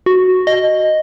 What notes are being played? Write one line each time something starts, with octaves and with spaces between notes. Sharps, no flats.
F#4
D#5